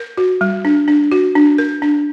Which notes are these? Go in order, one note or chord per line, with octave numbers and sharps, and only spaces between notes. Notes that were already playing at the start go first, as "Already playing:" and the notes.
Already playing: A#4
F#4
G3
D4
D4
F#4
D4
A#4
D4